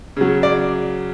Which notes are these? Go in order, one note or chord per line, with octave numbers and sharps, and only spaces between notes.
C#3 F#3
D5